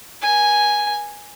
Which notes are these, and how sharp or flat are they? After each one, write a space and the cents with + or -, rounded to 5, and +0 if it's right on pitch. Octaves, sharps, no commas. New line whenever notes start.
A#4 +45 G#5 +0